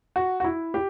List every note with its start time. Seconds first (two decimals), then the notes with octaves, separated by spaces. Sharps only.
0.16 F#4
0.40 F#4
0.44 E4
0.74 G4